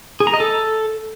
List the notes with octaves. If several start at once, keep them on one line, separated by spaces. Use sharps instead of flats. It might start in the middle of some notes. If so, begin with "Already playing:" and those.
G#4
A#5
D#5
A4